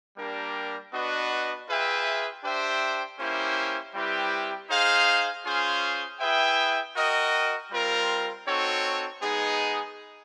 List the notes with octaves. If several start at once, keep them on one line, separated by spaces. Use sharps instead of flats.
G3 A#3 D4 G4 A#4
B3 D4 F#4 B4 D#5
F4 G#4 B4 E5 G5
D4 G4 C5 E5 G5
A#3 C#4 E4 G4 C5
G3 C4 E4 G4 B4
D#4 G#4 C5 F5
C#4 F4 G#4 C5 F5
E4 G#4 B4 E5 G5
F#4 A#4 D#5 G5
G3 C4 F4 A#4
C4 D#4 F#4 A4 C#5
G#3 B3 D#4 G#4